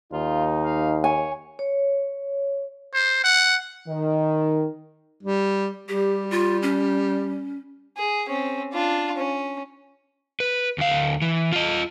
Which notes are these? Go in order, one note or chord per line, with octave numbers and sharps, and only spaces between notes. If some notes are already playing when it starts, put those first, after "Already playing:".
D#2 D#4 F4
F5
C#5 G#5
C#5
C5
F#5
D#3
G3
G3 G4
F4
C#4
G#4
C4 C#4
D4 F4
C#4
B4
D2 F5
E3
F4 D#5